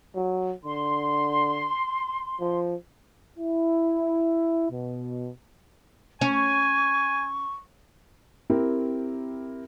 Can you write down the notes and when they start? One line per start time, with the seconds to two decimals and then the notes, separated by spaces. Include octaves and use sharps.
0.15 F#3
0.65 D3 C6
2.40 F3
3.37 E4
4.71 B2
6.21 C#4 G#5 C#6
8.50 C4 E4 G4 A#4